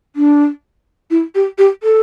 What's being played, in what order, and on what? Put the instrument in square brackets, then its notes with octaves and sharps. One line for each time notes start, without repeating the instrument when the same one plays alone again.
[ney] D4
E4
G4
G4
A4